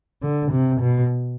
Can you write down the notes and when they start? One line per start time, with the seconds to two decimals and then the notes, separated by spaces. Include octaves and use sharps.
0.22 D3
0.51 C3
0.80 B2